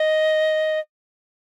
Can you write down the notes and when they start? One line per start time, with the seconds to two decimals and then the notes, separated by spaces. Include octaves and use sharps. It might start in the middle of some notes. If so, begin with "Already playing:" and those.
Already playing: D#5